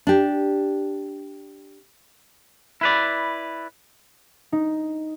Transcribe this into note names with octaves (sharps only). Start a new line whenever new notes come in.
D4 G4
E4 B4 D5
D#4